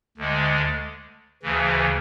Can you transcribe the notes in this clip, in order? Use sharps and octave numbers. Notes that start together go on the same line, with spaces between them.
D2 D3 G#3
D2 C#3 E3